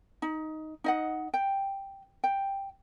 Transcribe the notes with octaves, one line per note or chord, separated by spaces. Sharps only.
D#4
D#4 D#5 F#5
G5
G5